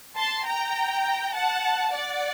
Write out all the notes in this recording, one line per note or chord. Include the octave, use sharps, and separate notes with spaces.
A5 C6
G5 A#5
F#5 A5
D5 F#5